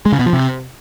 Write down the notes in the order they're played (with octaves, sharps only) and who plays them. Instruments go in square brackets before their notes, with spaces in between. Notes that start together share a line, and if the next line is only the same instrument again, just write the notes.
[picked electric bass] G#3
C#3
B2
F3
C3